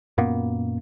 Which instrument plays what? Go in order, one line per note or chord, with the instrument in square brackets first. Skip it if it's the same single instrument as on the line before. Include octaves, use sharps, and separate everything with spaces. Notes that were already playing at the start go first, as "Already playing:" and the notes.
[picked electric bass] F#2 A#2 A#3 B3